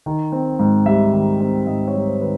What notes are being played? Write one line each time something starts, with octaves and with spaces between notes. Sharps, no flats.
D#3
C4
G#2
G3 E5
D#3
C4
G#2 D#5
C#5
G3
C5
D#3 B4